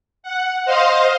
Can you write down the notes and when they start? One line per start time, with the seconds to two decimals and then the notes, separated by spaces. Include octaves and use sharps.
0.23 F#5
0.65 C5 D#5 F5 C6